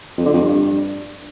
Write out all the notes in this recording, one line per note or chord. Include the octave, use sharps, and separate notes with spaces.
F2
D3
F2
G2